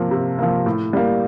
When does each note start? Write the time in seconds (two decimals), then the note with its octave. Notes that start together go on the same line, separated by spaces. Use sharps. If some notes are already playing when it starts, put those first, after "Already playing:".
Already playing: C3 F3 A#3
0.11 C3
0.39 F3 A#3
0.66 A2
0.93 G3 A#3